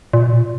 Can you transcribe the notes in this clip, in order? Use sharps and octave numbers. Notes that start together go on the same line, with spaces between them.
A#2
B2